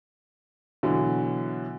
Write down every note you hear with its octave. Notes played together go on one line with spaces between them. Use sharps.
B2 D3 E3 F#3